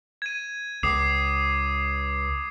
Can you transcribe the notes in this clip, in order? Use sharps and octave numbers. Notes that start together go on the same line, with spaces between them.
G#6 D#7
C#2 D6 D#6 C7